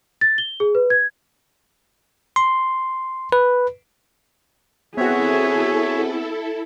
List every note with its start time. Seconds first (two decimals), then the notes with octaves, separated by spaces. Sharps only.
0.21 A6
0.38 G7
0.60 G#4
0.75 B4
0.90 G#6
2.36 C6
3.32 B4
4.97 B3 C4 E4 F#4 G#4 A4 C#5 E5